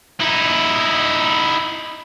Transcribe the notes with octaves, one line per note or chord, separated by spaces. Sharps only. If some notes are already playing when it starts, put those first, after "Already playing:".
D#4 E4